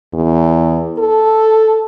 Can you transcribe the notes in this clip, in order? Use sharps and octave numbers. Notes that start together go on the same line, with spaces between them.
E2
A4